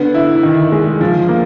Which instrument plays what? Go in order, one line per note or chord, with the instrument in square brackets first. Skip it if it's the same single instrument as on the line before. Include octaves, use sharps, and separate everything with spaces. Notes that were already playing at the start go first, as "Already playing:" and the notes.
Already playing: [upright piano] D3 B3
E4
D#3
G#3
F3
A#3